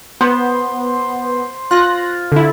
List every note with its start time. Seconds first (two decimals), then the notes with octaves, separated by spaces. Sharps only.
0.21 B3 C5
1.71 F4 F#6 A#6
2.32 D3 E4